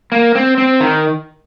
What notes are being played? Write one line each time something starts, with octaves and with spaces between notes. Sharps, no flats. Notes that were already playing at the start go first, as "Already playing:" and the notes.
A#3
C4
C4
D#3